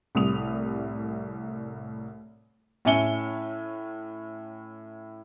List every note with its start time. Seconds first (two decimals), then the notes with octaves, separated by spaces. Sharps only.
0.15 C2 A2 G3 D#6 F7
2.85 A2 C#4 E5 G#5 C#7 G7